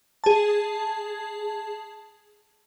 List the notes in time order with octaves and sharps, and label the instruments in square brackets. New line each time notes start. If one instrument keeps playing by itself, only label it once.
[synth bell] G#4 A5